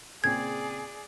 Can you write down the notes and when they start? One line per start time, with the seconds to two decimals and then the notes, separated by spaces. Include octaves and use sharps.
0.24 A#2 C#3 C4 G#4 D5 G#6